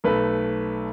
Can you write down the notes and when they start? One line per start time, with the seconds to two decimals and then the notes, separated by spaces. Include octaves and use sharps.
0.04 B1 A3 B4